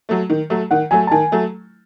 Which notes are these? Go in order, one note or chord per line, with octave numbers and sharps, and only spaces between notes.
F#3 A3
D#3
F#3 A3
D#3 F#5
F#3 A3 G#5
A5
D#3 G#5
F#3 A3